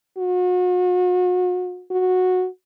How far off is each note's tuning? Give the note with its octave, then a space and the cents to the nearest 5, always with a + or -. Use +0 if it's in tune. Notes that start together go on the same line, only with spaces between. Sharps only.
F#4 -40
F#4 -10